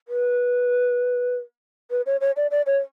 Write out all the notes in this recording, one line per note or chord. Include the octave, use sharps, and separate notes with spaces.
B4
B4
C#5
C#5
D5
D5
C#5